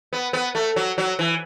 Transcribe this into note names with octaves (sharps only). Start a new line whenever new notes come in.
B3
B3
A3
F#3
F#3
E3